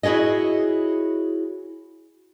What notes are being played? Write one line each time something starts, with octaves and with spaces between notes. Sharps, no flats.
E4 F#4 G#4 C#5 D#5